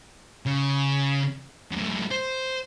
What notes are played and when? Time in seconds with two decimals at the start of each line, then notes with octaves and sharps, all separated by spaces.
0.46 C#3
1.71 F#2 A2
2.11 C5